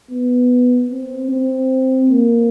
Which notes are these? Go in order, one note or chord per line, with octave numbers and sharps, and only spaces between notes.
B3
C4
C4
A#3